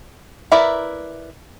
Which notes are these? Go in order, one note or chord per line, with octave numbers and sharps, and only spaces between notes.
E4 A#4 B4 D5 E5